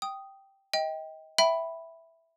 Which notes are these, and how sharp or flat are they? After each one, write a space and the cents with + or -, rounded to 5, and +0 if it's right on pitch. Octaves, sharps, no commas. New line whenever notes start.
G5 -5 D#6 +0
D#5 +30 G5 +5
E5 +0 G5 -25 B5 +0